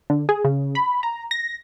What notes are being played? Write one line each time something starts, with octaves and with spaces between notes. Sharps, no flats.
D3
G#4
C#3
B5
A#5
A#6